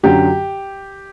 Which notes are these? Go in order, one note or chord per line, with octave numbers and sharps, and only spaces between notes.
F#2 D3 F#3 G4